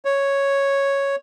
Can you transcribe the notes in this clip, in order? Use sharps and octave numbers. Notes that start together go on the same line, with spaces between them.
C#5